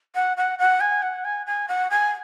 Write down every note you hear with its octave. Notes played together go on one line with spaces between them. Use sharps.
F#5
F#5
F#5
G#5
F#5
G#5
G#5
F#5
G#5